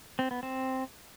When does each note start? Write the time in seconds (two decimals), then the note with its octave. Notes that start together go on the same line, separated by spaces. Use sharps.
0.19 C4
0.31 B3
0.43 C4